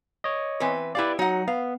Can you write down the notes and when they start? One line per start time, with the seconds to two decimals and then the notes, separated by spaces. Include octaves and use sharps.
0.24 C#5 D#5
0.60 E3 C4 B4
0.95 E4 G4 B4 D5 F5
1.19 F#3 D#4 F#5
1.47 B3 F5